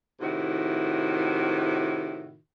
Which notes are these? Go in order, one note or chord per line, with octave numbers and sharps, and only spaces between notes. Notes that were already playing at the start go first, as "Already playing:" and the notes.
A2 C3 D#3 E4 F#4